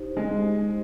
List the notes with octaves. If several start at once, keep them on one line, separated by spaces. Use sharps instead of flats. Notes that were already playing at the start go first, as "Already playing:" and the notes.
Already playing: D#4 G4 C5
G#3